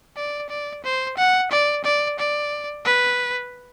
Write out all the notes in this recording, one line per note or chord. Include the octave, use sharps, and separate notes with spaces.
D5
D5
C5
F#5
D5
D5
D5
B4